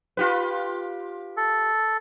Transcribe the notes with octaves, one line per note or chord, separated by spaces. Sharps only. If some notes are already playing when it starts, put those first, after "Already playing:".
F4 G4 B4
A4